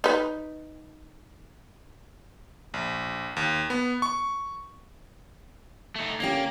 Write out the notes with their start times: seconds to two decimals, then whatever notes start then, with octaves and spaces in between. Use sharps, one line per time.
0.04 D#4 B4
2.74 A#1
3.36 D#2
3.70 B3
4.02 C#6
5.96 A3 D#4
6.20 D3 A#3 C#4 G4